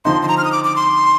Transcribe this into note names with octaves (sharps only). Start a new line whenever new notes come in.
D3 F3 C4 D#4 C6
C6
A#5
F6
D#6
D6
D6
C6